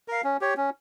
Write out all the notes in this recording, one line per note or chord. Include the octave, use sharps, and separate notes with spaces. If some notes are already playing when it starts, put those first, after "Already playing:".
A#4 F5
C#4
G4 C#5
C#4